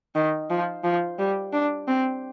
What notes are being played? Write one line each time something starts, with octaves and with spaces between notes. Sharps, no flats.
D#3
F3
F3
G3
D4
C4